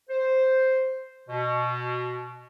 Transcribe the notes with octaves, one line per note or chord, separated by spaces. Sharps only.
C5
B2